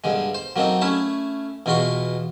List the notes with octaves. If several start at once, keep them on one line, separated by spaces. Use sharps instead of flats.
G2 D3 G#3
C5
F#3 A#3 C4 D#4 A4
A3 C#4 E4 C#5
E2 B2 F4 F#4 C6 C#6